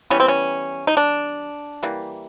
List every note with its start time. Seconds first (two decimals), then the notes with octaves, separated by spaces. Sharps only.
0.10 E3 G3 B3 C#4
0.20 C4
0.28 C#4
0.87 D#4
0.97 D4
1.83 E3 G3 A#3